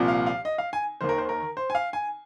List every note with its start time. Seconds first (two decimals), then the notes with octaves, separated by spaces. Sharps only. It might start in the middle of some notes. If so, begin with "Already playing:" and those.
Already playing: C2 A#2 F3
0.08 F5
0.27 F5
0.45 D#5
0.58 F5
0.73 G#5
1.01 D#2 D#3 C5
1.09 A#4
1.18 C5
1.29 A#4
1.57 C5
1.70 G#5
1.75 F5
1.93 G#5